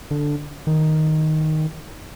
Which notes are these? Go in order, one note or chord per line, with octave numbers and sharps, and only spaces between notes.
D3
D#3